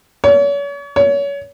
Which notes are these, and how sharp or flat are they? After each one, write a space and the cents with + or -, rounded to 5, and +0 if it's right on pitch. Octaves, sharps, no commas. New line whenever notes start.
C#5 +40
C#5 +30